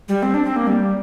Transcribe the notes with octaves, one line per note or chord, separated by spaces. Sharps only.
G3
C4
D4
C4
A#3
G3